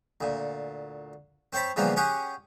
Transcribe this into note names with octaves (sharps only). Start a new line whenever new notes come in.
D2 A#2
C4 C5 C#5 A5 B5
C#3 E3 F3 G3 A#3 B3
C#4 G4 G#4 F#5